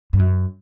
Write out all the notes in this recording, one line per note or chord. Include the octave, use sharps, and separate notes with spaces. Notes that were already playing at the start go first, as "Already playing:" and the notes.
G2
F#2